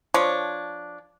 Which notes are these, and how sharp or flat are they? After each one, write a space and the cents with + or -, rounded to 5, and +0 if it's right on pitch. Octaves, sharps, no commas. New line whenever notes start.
F3 +0 D4 -5 C#5 +0